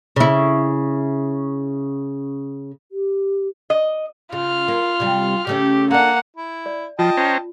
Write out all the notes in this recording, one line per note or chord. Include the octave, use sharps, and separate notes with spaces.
C#3 E4
G4
D#5
C#3 F4 F6
A#3
C3 G3
C#3 A3 C#4 G4
A#3 D4 A4 F#5
E4
D5
F3 F4 D#5 G5 A5
C#4 C5 A#5